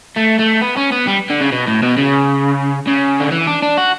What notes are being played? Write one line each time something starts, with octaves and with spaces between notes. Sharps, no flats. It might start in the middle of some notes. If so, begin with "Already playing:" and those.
A3
A3
B3
C#4
B3
G3
D3
C#3
B2
A2
B2
C#3
C#3
D3
E3
D4
D4
F#4